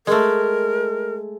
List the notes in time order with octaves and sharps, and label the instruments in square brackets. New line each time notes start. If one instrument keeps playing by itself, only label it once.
[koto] G#3 A3 [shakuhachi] A#4